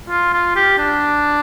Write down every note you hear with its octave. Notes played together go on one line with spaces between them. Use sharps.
F4
F4
G4
D4